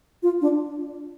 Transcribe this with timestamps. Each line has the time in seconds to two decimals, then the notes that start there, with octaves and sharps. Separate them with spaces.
0.23 F4
0.41 D4